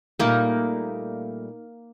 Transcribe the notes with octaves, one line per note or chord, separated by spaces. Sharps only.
A#2 G3 A3 A#3 D#4